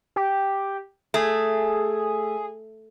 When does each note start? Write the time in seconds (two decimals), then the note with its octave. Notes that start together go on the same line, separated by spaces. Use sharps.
0.16 G4
1.14 A3 G#4